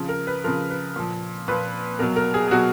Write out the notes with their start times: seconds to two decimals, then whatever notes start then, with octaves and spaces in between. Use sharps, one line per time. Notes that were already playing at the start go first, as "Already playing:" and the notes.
Already playing: C#3 F3
0.09 A#4
0.27 B4
0.44 C#3 F3 A#4
0.70 B4
0.96 A#2 F3
1.48 A#2 F3 B4
1.99 B2 F#3 A#4
2.16 A#4
2.34 G#4
2.48 G#4
2.51 B2 F#3 F#4